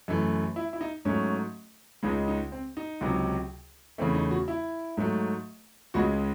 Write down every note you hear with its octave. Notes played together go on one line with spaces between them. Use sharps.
F#2 E3 A3
E4
E4
D#4
G#2 F#3 A3 C#4
C#2 C#3 G#3 D#4
D#4
C4
D#4
C#2 C3 F#3
E2 C#3 E3 A3 C4
D#4
F#4
E4
G#2 F#3 A3
C#2 C#3 G#3 F#4